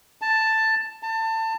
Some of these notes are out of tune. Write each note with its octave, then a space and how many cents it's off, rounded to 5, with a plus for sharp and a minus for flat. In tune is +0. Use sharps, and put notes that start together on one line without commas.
A5 +5
A5 +25